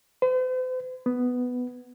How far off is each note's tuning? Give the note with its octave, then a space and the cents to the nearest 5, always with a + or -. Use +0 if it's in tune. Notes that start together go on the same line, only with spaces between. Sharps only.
C5 -45
B3 +5